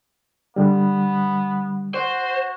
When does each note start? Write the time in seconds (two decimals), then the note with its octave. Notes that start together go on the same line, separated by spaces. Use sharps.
0.56 D3 G3 B3
1.94 F#4 C5